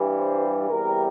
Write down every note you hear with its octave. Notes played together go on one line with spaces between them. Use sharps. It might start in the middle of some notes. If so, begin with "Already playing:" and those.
Already playing: G2 E3 G3
C5
E2 C3 G3 A#4